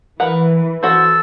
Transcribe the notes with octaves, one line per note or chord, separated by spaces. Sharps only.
E3 A#4 B4 F#5
F#4 A4 C5 E6